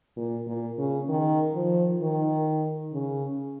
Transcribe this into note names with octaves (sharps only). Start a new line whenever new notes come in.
A#2
A#2
C#3
D#3
F3
D#3
C#3